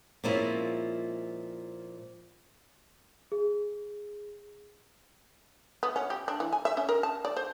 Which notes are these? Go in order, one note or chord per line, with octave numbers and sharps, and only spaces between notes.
A#2 F3 G#3 C4 C#4 E4
G#4
B3
C#4
G4
D4
E3
G#5
E5
C#4
A#4
A5
D5
C5